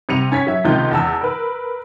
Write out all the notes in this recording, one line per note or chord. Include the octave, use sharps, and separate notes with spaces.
C3 G3 C#7 D#7 F7
C#4 G#6 B6
F#3 E5
C#2 C3 D#3 F4 G6
E2 A5 E6
A#4 B4